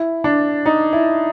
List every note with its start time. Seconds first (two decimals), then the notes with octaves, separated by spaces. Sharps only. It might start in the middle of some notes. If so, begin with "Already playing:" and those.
Already playing: E4
0.24 D4
0.66 D#4
0.93 E4